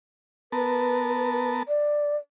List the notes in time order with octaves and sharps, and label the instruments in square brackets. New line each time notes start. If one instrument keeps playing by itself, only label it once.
[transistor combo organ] B3 A#4 A5 [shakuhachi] B4
[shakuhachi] D5